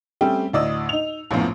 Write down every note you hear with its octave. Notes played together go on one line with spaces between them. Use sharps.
G3 A3 C4 C#4 G4
D2 A2 D5 D#5 D#6 E6
D#4 F7
A#1 F#2 A2 F3 B3